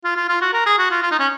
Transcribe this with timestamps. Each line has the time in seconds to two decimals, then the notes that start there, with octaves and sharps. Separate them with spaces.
0.05 F4
0.17 F4
0.29 F4
0.42 F#4
0.53 A#4
0.66 G#4
0.79 F#4
0.91 F4
1.03 F4
1.11 D#4
1.19 C#4